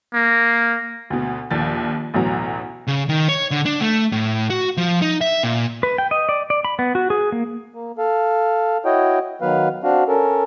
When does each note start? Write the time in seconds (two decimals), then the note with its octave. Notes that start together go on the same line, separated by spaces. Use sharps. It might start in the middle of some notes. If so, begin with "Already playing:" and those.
0.14 A#3
1.10 D2 B2
1.51 A#1 D#2 A6
2.14 A1 D2 B2 F#3 A#5
2.87 C#3
3.09 D#3
3.29 C#5
3.51 D3
3.65 D4
3.81 A3
4.12 A2
4.50 F#4
4.77 F3
5.02 D#4
5.21 E5
5.43 A#2
5.83 B4
5.98 G5
6.11 D#5
6.29 D5
6.50 D5
6.65 B5
6.79 B3
6.95 F#4
7.10 G#4
7.32 A#3
7.74 A#3
7.98 A4 F5
8.85 E4 F#4 C#5 D#5 G5
9.41 D#3 F#3 B3 B4 F5
9.84 C4 D4 F#4 F5
10.08 C#4 A4 A#4